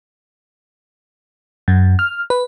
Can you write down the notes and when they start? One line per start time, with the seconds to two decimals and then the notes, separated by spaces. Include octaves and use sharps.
1.68 F#2
1.99 F6
2.30 B4